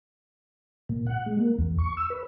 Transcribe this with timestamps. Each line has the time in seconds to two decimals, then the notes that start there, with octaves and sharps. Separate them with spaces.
0.89 A#2
1.07 F#5
1.26 G#3
1.39 A#3
1.59 E2
1.78 C#6
1.97 E6
2.10 B4